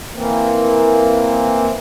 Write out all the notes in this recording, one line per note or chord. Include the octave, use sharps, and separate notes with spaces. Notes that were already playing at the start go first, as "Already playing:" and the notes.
E3 A#3 C4